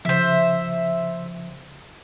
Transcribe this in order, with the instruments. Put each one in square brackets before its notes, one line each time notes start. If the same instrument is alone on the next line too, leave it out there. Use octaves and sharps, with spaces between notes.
[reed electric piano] C#3 F3 [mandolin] C5 E5